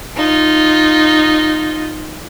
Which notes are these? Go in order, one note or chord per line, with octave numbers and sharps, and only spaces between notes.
D#4 F4